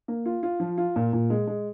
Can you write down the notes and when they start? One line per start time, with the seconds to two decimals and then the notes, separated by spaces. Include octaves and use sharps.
0.08 A#3
0.26 F4
0.43 F4
0.60 F3
0.78 F4
0.96 A#2
1.13 A#2
1.30 G#3
1.47 G#3